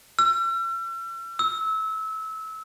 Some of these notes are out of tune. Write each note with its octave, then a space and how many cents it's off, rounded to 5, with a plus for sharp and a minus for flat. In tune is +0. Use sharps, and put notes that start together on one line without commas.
E6 +45
E6 -25